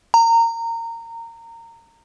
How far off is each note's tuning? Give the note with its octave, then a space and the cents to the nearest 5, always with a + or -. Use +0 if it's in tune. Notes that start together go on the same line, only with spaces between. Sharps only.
A#5 -20